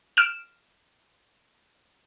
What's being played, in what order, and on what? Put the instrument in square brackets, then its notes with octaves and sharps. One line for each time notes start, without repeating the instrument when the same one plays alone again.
[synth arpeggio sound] F6 D7 E7